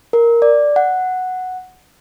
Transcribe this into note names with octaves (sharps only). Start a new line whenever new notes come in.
A#4
D5
F#5